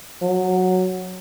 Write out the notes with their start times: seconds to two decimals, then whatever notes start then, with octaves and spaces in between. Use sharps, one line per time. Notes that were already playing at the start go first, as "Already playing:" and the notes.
0.22 F#3